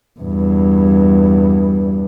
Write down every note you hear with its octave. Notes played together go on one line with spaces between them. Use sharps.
E2 G2